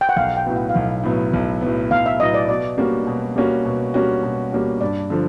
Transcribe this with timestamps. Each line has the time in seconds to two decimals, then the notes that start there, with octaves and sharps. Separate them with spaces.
0.01 G5
0.09 F#5
0.16 B1 F5
0.37 G5
0.46 A2 F#3 B3
0.56 F#5
0.69 F5
0.75 B1 F#5
1.03 A2 F#3 B3
1.33 B1
1.61 A2 F#3 B3
1.91 B1 F5
2.06 E5
2.20 A2 F#3 B3 D#5
2.34 D5
2.49 B2 D5
2.77 G3 A#3 C#4 F#4
3.07 B2
3.36 G3 A#3 C#4 F#4
3.65 B2
3.94 G3 A#3 C#4 F#4
4.23 B2
4.52 G3 A#3 C#4 F#4
4.81 G2 D5
5.10 D3 F3